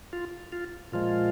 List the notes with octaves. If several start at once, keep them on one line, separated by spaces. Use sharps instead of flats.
F4
F4
A#2 F3 G#3 F4